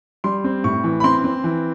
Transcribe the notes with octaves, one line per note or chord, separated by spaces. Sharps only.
G3 C6
C4
A2 C#6
E3
B5
C4 C6
C4
E3